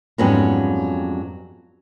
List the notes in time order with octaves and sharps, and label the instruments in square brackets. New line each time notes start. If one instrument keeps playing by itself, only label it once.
[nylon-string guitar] F2 G#2 F#3 G3 B3 C#4